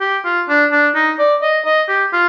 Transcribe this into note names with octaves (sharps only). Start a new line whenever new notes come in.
G4
F4
D4
D4
D#4
D5
D#5
D#5
G4
F4